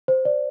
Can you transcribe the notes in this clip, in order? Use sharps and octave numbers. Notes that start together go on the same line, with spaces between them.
C5
D5